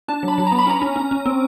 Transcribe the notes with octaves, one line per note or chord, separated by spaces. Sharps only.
D4 A5
F#3 B5
F#3
B3 A#5
B5
C#4 A#5
C#4
C#4
C#4
C4